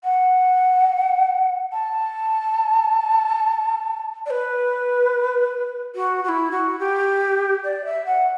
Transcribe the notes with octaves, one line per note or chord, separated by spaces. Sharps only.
F#5
A5
D5
B4
F#4
F#4
E4
F#4
G4
D5
E5
F#5